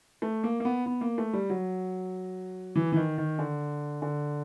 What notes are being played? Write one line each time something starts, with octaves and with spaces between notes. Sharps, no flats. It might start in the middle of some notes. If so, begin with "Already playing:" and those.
A3
A#3
A#3
B3
B3
A#3
A3
G3
F#3
E3
E3
D#3
D#3
D3
D3